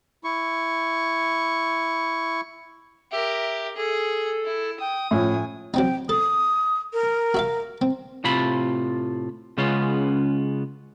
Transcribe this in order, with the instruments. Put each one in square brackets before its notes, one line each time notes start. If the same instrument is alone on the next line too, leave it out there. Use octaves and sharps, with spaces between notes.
[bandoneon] E4 C#6
[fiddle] G4 A#4 [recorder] E5
[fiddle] G#4 [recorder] A4
[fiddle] E4
[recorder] G5 [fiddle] D#6
[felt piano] A2 F3 C#4 [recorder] G#5
[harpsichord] F#3 C4 D#4 [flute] G5
[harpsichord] A4 [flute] D#6
[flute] A#4
[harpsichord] F#4 E5 F5
C4
[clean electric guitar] A2 C3 F4 A4 B5
C#3 G#3 B3 C#4 F4